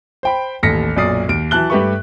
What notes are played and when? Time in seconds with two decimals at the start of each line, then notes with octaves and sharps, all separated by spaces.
0.23 C5 G5 B5
0.63 A1 D#2 A4 A#6 B6 C#7
0.96 B1 F#2 A#2 D5 D#6 C7
1.29 D#2 D7
1.51 E3 F#3 A5 F#6 G7
1.70 G2 A3 G4 B4 E5 C#6